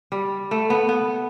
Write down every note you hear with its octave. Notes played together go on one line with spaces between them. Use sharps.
G3
A3
B3
B3